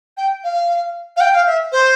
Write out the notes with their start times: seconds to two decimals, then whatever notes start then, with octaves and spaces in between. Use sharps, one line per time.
0.17 G5
0.43 F5
1.16 F5
1.20 G5
1.33 F5
1.46 E5
1.72 C5